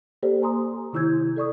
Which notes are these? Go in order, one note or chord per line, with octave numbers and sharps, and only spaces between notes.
A#3 G4 A4 C5 D5
G#5 A#5 C6 D#6
C3 D#3 E4 E6 G6 G#6
A4 D5 C#6 D#6